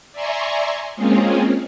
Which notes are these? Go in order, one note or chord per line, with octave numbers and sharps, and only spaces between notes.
D5 E5 G#5 A#5 C6 C#6
G#3 A#3 C4 C#4 F4 G#4